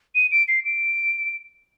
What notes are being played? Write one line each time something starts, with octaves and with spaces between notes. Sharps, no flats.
D#7
D7
C7
D7